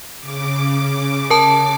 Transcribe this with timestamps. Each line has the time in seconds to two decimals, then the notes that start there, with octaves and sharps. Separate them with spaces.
0.20 C#3 D6
1.30 A#4 A5